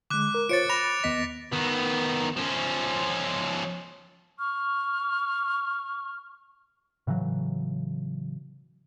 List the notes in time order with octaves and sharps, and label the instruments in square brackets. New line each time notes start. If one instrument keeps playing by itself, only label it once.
[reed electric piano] D3 G#3 [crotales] D6 F#6
[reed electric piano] A#4
[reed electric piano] F4 C5 C#5 [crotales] A6 C#7 D7
[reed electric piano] B5 [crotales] A#6 F7
[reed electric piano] D#2 B3 D#5 [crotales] B6
[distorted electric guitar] D#3 B3
F3 C#4
[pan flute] C#6 [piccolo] F6
[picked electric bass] A2 C#3 E3 F#3